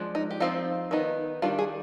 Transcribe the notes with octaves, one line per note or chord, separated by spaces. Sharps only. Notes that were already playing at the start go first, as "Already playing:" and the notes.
Already playing: F3 G#3 D4
D#4
G4
F3 G#3 C4 D#4 F4
D#3 B3 D#4
D#3 G3 D4 F4
G#4